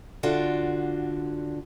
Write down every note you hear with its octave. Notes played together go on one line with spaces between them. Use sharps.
D3 F4 F#4 D5